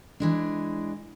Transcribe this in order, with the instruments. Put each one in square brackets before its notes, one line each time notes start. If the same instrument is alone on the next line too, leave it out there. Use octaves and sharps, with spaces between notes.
[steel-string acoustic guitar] E3 G#3 D4